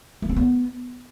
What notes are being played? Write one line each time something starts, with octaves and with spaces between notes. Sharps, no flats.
A3
C4
B3